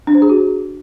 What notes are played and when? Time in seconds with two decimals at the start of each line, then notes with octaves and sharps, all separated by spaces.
0.07 D4
0.15 C5
0.22 G#4
0.29 F#4